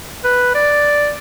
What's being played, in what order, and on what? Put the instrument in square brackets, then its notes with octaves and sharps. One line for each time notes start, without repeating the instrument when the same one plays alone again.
[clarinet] B4
D5